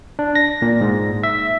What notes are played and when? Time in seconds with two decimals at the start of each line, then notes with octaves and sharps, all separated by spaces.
0.19 D4
0.35 A#6
0.62 A#2
0.81 G#2
1.23 E5